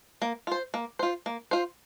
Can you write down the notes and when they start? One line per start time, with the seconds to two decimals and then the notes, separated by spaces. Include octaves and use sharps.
0.22 A#3
0.47 F4 C5
0.74 A#3
0.99 F4 C5
1.26 A#3
1.51 F4 C5